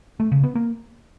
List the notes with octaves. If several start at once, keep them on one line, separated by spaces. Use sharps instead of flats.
A3
C#3
B3
A#3